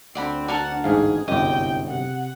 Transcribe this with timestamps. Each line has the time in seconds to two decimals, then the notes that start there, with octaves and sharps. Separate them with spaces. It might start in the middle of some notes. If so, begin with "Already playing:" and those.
0.15 D2 C4 D5 F#5 B5
0.48 D4 F#4 A#4 F#5 A5
0.84 A1 G#2 G#4 F5
1.28 G1 C2 F#2 D#5 G5 D6
1.88 C3 F#5